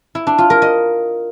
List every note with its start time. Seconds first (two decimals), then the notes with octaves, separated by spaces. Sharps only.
0.15 E4
0.27 D4
0.38 F4
0.50 A#4
0.62 D#5